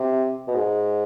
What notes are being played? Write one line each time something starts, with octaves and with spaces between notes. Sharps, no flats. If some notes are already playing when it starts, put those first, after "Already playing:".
Already playing: C3
B2
G#2